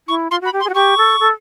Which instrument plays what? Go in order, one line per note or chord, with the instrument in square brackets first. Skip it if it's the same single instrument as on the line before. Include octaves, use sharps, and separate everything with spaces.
[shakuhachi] E4 [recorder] C#6
[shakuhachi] F4 [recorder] C6
[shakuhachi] F#4 [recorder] B5
[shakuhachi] G4
[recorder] C6
[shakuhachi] G#4
F#4
[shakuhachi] G4 [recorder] C#6
[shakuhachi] A4
A4